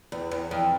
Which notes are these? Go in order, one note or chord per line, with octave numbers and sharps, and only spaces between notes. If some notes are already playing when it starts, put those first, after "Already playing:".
E2
E2
F2